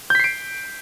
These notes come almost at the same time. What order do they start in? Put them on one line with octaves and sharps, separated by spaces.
G6 B6 C7 D7